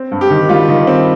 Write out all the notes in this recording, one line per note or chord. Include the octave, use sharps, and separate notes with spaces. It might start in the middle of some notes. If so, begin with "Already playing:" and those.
Already playing: C4
G2
G4
D#3
G3 F4
D#3
C4